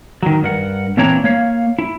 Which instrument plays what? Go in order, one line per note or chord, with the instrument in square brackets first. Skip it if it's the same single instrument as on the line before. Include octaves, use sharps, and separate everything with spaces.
[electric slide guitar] D#3 F#3
G2 A#4 F#5
A#2 E3 C4 D4 C#5 A#5
A#3 C#5 F5
E4